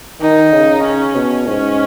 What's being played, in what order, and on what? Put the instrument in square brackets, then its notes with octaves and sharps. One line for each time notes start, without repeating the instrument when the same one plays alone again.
[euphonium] D#3 [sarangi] D#4
[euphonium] C#3
[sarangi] C#4
[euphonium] B2
[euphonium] G#2 [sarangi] C#4